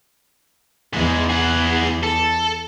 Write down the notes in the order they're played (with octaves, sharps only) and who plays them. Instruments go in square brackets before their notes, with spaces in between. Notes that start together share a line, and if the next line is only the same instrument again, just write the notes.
[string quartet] E2 [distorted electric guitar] G#2 G#3
[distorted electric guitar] G#4 F#5
A4